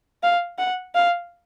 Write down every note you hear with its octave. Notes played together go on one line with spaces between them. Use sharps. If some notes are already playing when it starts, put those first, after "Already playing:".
F5
F#5
F5